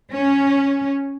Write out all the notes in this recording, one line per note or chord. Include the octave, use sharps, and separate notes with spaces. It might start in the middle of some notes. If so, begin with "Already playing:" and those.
C#4